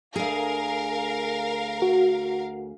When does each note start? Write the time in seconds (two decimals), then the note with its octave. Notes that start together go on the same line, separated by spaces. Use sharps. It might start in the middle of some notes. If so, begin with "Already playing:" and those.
0.16 D2 G#4 A#4 F5
1.82 F#4